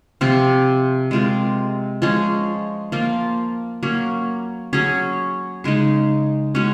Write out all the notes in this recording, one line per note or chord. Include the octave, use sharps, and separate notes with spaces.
C3 F3 C4 F4
G#3 C4 F4 A#4
F3 G#3 C#4
F3 A#3 F4
F#3 A#3 C#4
F#3 C#4 G#4
C#3 G#3 D#4
G#3 C#4 F#4